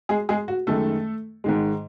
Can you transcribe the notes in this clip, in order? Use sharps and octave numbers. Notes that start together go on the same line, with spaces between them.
G#3 G#4
G#3 G#4
F#4
F#2 D#3 G#3 A3 A4
G#2 D#3 G#3